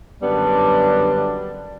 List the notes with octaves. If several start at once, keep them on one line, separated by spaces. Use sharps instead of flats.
F#2 D3 G3 B3 D4